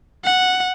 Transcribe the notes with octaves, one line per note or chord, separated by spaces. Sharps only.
F#5